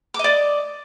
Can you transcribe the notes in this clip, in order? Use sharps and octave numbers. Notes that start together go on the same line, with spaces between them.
D5 D#5 D6